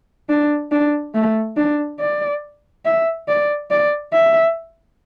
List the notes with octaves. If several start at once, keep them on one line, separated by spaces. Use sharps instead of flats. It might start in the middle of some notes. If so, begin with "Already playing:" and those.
D4
D4
A3
D4
D5
E5
D5
D5
E5